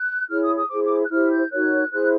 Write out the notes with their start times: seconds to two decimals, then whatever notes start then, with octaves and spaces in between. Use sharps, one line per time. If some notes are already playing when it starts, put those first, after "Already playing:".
Already playing: F#6
0.29 E4 G#4 C#5 F6
0.44 D#6
0.56 D#6
0.69 E4 G#4 C5 D6
0.84 D6
1.05 F#6
1.10 E4 G4 C5 F6
1.31 G6
1.51 D#4 F#4 A#4 C#5 F#6
1.91 E4 G#4 C5 F#6